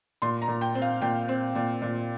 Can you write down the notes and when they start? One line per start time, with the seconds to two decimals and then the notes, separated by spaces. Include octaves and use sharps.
0.22 A#2 C6
0.42 A#5
0.48 A#2
0.61 G5
0.75 C4
0.82 F5
1.02 A#2 G5
1.28 C4
1.55 A#2
1.82 A#2